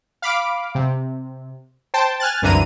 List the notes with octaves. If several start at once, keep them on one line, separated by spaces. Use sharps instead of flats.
F5 B5 D6
C3
C5 G5 A5
G#5 F6 F#6 A6
C2 F#2 D3 E3 A#5 D#7